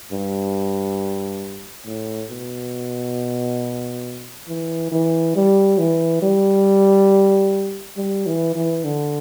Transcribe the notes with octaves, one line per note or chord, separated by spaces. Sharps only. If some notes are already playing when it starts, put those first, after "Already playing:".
G2
A2
B2
E3
E3
G3
E3
G3
G3
E3
E3
D3